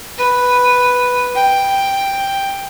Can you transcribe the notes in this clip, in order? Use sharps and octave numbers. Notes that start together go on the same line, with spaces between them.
B4
G5